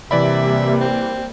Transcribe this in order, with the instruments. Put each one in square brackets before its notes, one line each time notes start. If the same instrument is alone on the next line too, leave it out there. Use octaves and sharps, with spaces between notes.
[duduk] C3 [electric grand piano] E3 D5 B5 [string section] G3 A#3 [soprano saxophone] E5
[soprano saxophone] C4